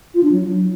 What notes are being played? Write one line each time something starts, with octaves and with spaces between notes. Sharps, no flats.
F4
D4
F#3